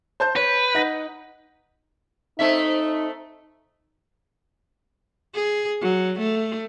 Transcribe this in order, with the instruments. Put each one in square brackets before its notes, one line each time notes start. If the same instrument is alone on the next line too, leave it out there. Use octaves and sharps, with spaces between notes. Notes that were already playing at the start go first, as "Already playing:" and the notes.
[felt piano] C5 A5 G6
[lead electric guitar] B4 [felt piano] C#5
[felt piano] D#4 F#5 A#6
[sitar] A3 C4 E5 [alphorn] D#4
[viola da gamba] G#4
F#3
A3